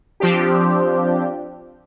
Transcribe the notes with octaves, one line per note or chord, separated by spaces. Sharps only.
F3 C4 D4 G4